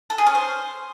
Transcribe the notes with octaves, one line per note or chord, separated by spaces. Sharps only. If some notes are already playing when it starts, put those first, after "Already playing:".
A4
G#4
C#4
C5